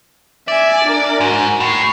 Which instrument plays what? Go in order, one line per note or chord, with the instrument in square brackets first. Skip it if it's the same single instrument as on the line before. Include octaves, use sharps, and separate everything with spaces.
[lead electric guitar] D5 [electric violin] E5 G#5
[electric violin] D4 A#4
[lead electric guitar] G#2 [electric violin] F#4
[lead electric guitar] A2 [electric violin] C#6 C7